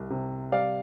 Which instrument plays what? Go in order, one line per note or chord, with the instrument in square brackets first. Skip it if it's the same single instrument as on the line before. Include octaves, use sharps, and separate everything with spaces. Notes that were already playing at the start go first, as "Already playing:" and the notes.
Already playing: [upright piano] C2
C3
G3 D5 F5